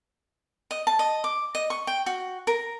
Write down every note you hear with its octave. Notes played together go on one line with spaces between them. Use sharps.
D#5
A5
D#5
D6
D#5
C#6
G5
F#4
A#4